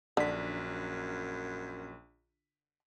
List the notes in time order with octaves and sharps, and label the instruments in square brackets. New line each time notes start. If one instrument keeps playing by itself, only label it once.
[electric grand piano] A#1 B6 [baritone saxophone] F#2 [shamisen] D3